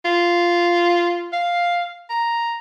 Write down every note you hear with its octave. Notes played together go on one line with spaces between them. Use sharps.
F4
F5
A#5